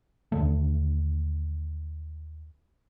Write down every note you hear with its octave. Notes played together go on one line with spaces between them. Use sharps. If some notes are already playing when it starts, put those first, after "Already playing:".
D#2 D3 A3